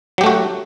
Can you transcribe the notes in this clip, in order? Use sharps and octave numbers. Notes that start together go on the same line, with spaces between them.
F#3 A3 F#4 G4